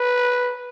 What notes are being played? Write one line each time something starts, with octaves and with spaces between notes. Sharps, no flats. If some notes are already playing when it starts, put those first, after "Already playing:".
Already playing: B4